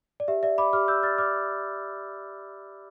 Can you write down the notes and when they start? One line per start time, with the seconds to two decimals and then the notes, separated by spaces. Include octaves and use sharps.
0.20 D5
0.28 G4 E5
0.43 D5 E5
0.58 D5 B5 D6
0.73 G4 D6 F6
0.88 D5 E6 G6
1.03 D5 F6 A6
1.18 D5 D6 F6